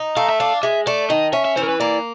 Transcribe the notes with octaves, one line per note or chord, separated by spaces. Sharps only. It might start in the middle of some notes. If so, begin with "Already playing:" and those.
Already playing: D#4
A3 F5
E5
D4 F5
G#3 E5
A3 D5
D#3 D#5
C#4 E5
E5
E3 C5
A#4
B4
A#3 D5